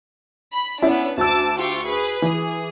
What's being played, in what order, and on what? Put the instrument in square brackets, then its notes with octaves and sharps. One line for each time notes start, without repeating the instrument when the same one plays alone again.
[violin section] B5
[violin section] B3 D4 [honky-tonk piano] C#4 E4
[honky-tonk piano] D2 E6 [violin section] A5 D6
[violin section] F4 G4 C#6
G#4 B4
[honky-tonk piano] E3 [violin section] G#4